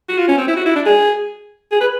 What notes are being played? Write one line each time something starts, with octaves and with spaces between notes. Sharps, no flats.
F#4
F4
C#4
C4
E4
F#4
E4
D4
G#4
G#4
B4